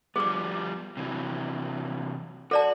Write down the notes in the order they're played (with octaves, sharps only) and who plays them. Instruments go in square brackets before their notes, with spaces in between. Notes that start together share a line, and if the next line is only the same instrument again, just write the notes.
[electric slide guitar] F3 G3 B3 [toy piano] G#4 D6
[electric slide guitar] C3 E3 F#3
[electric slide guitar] F#4 [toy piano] A4 D5 A5